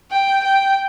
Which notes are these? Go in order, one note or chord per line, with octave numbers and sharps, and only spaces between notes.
G5
G5